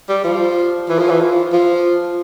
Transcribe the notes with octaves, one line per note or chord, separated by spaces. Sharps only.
G3
F3
E3
F3
E3
F3
F3